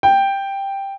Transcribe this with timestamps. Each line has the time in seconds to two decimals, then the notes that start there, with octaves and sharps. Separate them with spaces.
0.03 G5